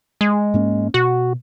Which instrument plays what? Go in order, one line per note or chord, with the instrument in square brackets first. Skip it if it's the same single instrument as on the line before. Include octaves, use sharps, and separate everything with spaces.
[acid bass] G#3
[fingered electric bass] G#2 A#3 C#4
[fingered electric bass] B2 [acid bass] F#4